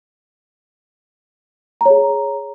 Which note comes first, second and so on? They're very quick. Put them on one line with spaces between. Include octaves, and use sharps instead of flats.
A#5 C#5 G#4